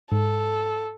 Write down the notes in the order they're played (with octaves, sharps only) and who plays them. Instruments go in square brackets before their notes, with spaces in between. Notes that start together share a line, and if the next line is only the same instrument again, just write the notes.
[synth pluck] G#2 [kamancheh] A4